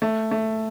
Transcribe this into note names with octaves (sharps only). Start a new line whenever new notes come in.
A3
A3